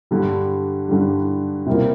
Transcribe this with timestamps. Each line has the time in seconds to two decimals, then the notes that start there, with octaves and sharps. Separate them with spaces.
0.11 G2 D3 G3
0.89 G2 D3 G3
1.66 C3 G3 A#3 F4